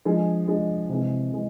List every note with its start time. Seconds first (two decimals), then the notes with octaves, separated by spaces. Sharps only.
0.05 F3 G#3 D4 G#4
0.48 F3 G#3 D4 G#4
0.89 C3 E3 G#3
1.32 C3 E3 G#3